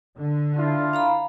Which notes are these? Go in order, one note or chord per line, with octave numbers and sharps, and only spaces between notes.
D3
D4 E4 F4
F5 A#5 B5